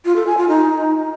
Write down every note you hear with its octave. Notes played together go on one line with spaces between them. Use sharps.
F4
A4
G#5
F4
D#4